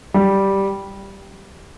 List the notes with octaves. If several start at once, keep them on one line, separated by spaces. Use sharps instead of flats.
G3